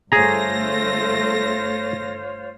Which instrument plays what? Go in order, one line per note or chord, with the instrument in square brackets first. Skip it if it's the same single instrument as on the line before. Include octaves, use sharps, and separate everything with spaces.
[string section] G1 A3 A#6 [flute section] F4 C5 C#5 [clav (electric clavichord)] G#4 A#5